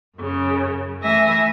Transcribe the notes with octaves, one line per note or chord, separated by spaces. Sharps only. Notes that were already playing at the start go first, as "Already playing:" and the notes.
F#2 C#3
E3 A3 E5 G#5 A#6